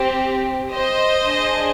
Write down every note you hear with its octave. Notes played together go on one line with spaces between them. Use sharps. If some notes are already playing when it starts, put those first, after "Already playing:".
Already playing: C4 G4
C5 D#5
D4 G#4